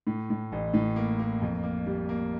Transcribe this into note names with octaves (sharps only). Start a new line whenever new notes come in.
A2
A2
A1
A2
A#3
A#3
F2
A#3
G3
A#3